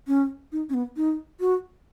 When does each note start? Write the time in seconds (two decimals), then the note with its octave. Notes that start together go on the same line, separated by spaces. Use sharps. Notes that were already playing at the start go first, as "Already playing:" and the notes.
0.07 C#4
0.52 D#4
0.69 C#4
0.74 B3
0.97 D#4
1.40 F#4